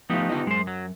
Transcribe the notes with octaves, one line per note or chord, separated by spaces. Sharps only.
F3 A3 B3 D#4 F4 G4
D3 F4 D#5
F#2 G#3 C5
F#3